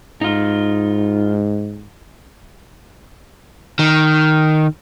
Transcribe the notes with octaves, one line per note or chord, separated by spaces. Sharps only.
G#2 D#4 F4
D#3